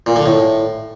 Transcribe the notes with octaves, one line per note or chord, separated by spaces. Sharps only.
A#2
D3
A2